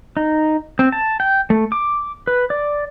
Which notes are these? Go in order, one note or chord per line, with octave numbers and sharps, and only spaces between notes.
D#4
C4
A5
G5
A3
D6
B4
D5